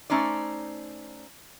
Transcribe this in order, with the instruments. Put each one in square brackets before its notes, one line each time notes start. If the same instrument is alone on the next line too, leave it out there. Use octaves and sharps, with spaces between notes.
[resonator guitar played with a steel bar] A3 C#4 D#4 C5 D5